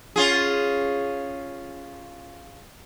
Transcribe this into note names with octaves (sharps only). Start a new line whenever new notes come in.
C#4 F4 G#4